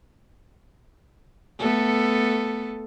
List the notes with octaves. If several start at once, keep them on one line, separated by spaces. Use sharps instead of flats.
A3 B3 A4